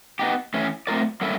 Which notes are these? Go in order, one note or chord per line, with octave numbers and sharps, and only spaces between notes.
B3 D#4 G4
E3 A3 C#4
A3 C4 F4 A#4 D5
G3 A#3 C#4 E4 A4